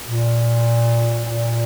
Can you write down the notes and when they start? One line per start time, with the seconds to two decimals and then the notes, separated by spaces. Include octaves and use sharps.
0.07 A#2
1.25 A#2